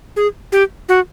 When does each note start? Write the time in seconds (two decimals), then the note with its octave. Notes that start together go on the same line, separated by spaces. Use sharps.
0.16 G#4
0.52 G4
0.89 F#4